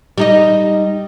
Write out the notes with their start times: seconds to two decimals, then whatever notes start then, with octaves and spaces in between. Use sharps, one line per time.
0.18 G3 D#4 D#5